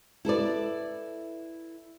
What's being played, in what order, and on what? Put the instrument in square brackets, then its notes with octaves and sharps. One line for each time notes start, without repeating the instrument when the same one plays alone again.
[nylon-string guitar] E4 A4 B4 D5